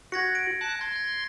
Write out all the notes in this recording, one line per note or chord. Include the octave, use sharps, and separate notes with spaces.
F#4 G#6 A#6 C#7
D7
A5 F#6
C6 G#6
G#6